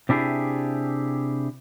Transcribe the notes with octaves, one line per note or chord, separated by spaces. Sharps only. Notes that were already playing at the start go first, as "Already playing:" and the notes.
C3 D4 E4 G4 G#4